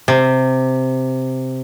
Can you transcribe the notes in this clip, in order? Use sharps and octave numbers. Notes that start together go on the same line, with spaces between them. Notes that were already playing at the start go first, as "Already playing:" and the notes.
C3